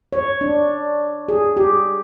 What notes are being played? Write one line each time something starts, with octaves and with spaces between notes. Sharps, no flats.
C#5
D4
G#4
G4